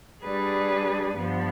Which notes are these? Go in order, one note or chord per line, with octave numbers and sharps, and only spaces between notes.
G3 D4 G#4 B4
G2 F3 B3